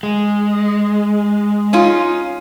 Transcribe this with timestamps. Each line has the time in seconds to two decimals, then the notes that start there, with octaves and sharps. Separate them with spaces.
0.03 G#3
1.73 C#4 D#4 F4